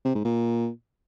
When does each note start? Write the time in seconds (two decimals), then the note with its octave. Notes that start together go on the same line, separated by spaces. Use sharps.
0.05 C3
0.15 G#2
0.25 A#2